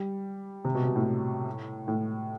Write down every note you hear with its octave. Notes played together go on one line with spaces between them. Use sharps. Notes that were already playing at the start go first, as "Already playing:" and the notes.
Already playing: G3
C3
B2
B2
A2
A2